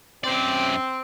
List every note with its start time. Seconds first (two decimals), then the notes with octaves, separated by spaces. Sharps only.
0.24 F#2 C4 D5